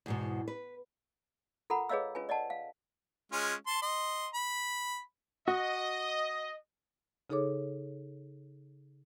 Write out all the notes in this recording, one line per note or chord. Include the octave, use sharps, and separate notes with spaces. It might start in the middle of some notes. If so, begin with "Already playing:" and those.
E2 G#2 B2
B4
F4 A4 A#4 F#5 A#5 B5
G#4 B4 C#5 D#5 F5 E6
C#4 F4 B4 G#5
D5 D#5 F#5 A5
F5
G#3 C#4 F4
A5 C6
D#5 C6
B5
F#4 D#5
C#3 D#4 G#4 A4 C#5 D6